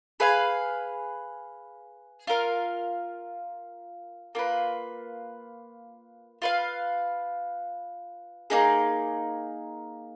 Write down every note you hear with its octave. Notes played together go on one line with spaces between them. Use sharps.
G#4 B4 F5 G#5
F4 A#4 F5
A#3 F4 B4
F4 B4 F5
A#3 D#4 G#4